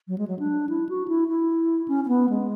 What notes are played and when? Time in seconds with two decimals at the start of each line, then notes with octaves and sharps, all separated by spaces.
0.08 F#3
0.18 G#3
0.28 F#3
0.39 D4
0.69 E4
0.89 F#4
1.08 E4
1.28 E4
1.88 C#4
2.05 C#4
2.08 B3
2.29 G#3